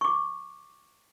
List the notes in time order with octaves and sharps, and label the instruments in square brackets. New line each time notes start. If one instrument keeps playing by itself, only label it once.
[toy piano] C#6 D6